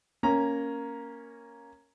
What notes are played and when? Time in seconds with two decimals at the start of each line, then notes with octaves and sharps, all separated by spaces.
0.23 A#3 C#4 A#5